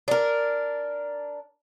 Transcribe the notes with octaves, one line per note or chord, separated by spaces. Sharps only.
D4 A#4